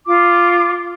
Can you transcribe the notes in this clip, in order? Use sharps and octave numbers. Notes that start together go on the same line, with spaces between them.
F4 D6